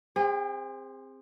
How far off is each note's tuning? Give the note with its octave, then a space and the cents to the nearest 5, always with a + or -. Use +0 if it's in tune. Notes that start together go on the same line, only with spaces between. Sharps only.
C4 +5 G#4 -40